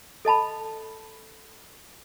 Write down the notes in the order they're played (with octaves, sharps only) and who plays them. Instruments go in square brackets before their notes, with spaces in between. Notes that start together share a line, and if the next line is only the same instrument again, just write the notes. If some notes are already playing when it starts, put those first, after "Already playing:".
[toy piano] A4 D#5 A5 B5